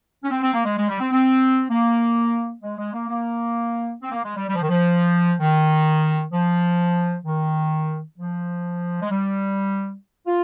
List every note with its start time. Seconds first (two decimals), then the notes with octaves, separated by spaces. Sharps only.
0.23 C#4
0.30 C4
0.42 C4
0.53 A#3
0.65 G#3
0.77 G#3
0.88 G3
1.00 C4
1.11 C4
1.70 A#3
2.62 G#3
2.78 G#3
2.93 A#3
3.08 A#3
4.01 C4
4.12 A#3
4.24 G#3
4.36 G3
4.47 G3
4.54 F3
4.61 D#3
4.69 F3
5.39 D#3
6.32 F3
7.25 D#3
8.17 F3
9.01 G#3
9.10 G3
10.26 F4